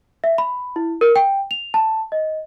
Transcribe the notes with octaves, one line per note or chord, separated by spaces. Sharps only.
E5
B5
E4
A#4
G5
F7
A5
D#5